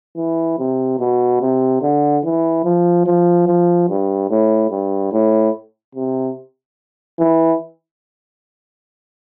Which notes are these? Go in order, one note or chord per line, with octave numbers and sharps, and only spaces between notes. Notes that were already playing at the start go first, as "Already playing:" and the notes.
E3
C3
B2
C3
D3
E3
F3
F3
F3
G2
A2
G2
A2
C3
E3